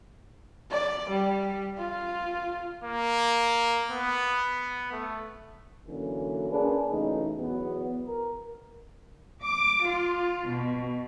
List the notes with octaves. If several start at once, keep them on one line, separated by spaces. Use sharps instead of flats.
D5
G3
F4
A#3
B3
A3
D3 E3 F#3 A#3 C#4
A#3 C#4 D4 G#4 B4
B1 C#3 E3 A3 D#4
E2 F#3 B3
A#4
D6
F4
B2